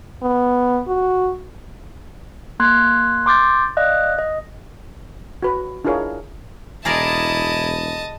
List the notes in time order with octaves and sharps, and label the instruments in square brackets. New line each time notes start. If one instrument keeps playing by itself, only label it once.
[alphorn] B3
F#4
[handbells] A#3 C6 F#6 G#6
C6 D6 G6 A6
D5 D#5 F5 F#6
D#5
[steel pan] F#4 B4
D4 E4 F4 G#4 A#4 C#5
[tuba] E1 [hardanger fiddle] E4 [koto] G#4 A#4 D5 [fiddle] D#5 A5